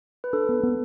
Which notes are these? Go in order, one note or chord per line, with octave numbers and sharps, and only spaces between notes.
B4
D4 A4
B3
B3